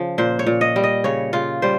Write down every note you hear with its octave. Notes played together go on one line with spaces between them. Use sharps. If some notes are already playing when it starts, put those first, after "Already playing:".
Already playing: C#3 F3
A#2 C5
C#5
A#2
D#5
G3
D#5
C#3 C#5
C#3 F4
G3 C5